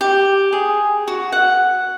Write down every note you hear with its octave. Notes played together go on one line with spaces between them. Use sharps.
G4
G#4
F#4
F#5